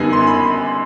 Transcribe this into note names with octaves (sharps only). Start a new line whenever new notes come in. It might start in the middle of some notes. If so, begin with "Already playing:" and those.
Already playing: F#2 D3 G3 B3 D#4 G#5
C6
B5